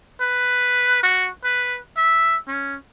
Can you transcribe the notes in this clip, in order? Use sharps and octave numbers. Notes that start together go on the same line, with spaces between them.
B4
F#4
B4
E5
C#4